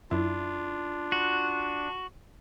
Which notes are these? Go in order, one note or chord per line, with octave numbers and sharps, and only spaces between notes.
F#2 D4 E4 F4
F#4